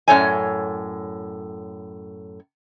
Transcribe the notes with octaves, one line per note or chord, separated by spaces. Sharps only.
F#2 A2 A4 C#5 D5 G#5